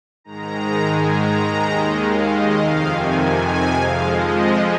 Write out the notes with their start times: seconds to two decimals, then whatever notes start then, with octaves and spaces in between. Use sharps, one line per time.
0.24 G#2 D#3 G#3 A#5
0.83 G#5
1.13 A#5
1.42 D#2 D#3 G#3
1.71 D#5
2.00 F5
2.30 D#5
2.58 F2 C3 D#3 F5
2.88 G#5
3.18 G#5
3.46 G#5
3.75 F2 F3 G#3 F5
4.05 D#5
4.34 D#5